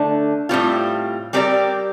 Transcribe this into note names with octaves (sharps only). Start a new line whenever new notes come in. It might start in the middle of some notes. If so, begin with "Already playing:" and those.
Already playing: D3 A3 D4
A2 G3 C4 F4
G3 C4 G4 A#4 D5